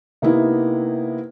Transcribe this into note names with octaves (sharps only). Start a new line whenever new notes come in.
C3 A#3 B3 D#4 E4